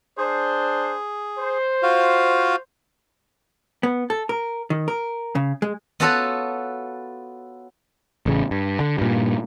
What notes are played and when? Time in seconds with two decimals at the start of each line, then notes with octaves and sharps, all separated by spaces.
0.18 D4 G#4 C5
1.38 C5
1.83 F4 F#4 F5
3.83 B3
4.10 A4
4.29 A#4
4.70 D#3
4.88 A#4
5.35 C#3
5.62 G#3
6.00 B3 F4 F#4 A4 C#5 F#5
8.26 A1 C#3
8.51 G2
8.80 D3
8.98 G2 A#2